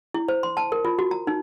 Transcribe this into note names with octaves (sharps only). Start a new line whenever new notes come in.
E4
C5
C6
A5
A#4
F4
F#4
A#5
D#4